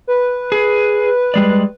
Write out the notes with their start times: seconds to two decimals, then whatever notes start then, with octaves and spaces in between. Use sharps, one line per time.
0.07 B4
0.52 G#4
1.34 G3 G#3 D5